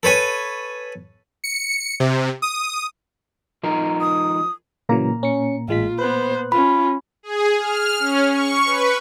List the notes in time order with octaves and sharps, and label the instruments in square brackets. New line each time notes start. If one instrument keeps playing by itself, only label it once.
[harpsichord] A4 B4 C#5 G#5
[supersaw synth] C#7
C3
D#6
[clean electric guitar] F3 D#4 A#4
[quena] D#6
[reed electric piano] A#2 A#3 A#5 [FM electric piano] C#3 E3 F#3
[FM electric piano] C#4 C#7
[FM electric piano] A1 G#3 B6 [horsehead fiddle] F4
[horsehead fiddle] B3 C5 [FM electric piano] B4 F#6
[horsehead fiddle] C#4 F4 [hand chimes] B5
[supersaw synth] G#4
F6
C#4
C#6
B4